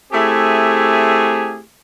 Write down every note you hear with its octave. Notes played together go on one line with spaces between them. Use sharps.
A3 C4 E4 G4 G#4